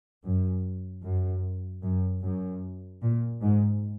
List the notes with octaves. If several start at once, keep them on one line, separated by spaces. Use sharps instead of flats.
F#2
F#2
F#2
F#2
A#2
G#2